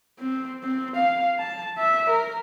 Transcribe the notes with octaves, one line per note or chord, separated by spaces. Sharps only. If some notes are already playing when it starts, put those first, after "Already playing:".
C4
C4
F5
A5
E5
A#4